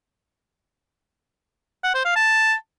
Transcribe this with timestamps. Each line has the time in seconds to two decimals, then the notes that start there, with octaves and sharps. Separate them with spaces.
1.84 F#5
1.94 C5
2.05 F5
2.16 A5